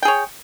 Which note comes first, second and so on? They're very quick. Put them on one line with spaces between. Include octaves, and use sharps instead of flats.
G5 G#4 C#5